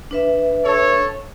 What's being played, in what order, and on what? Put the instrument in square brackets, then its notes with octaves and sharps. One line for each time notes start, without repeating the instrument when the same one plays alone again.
[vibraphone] D4 B4 E5
[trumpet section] A4 C#5